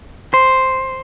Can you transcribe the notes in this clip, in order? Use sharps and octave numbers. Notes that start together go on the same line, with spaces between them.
C5